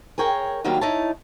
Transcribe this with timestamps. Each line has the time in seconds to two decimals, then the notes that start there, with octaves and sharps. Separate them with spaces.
0.18 G#4 A#4 C#5 G5 A#5
0.64 D#2 D#3 F#3 G3 A#3 F5
0.81 D#4 E4 C#5 A5